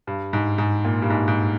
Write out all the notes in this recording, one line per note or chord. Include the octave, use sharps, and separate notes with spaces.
G2
G#2
G#2
A#2
G2
G#2
G#2